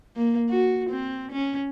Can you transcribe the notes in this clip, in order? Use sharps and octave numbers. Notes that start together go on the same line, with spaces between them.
A#3
F#4
C4
C#4